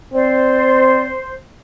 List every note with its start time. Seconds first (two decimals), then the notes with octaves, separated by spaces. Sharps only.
0.14 C4 C5 D5